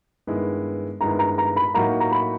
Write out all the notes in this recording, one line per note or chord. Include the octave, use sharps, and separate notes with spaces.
G2 D#3 G#3 B3 E4
G2 D#3 G#3 B3 E4 A#5
A#5
A#5
B5
A2 F#3 A#3 D#4 F#4 A#5
A#5
B5